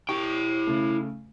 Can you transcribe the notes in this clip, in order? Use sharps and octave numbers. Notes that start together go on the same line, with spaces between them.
E4 G4 G5 C#6
C#3 A3